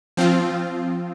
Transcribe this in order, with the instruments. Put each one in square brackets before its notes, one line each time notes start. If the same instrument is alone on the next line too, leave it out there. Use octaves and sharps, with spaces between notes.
[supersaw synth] F3 C4 F4